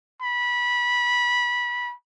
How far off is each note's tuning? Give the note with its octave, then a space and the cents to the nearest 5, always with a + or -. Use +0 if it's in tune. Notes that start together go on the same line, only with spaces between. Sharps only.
B5 -20